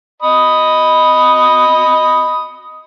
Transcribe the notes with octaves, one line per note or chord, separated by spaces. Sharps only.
D#5 B5 D#6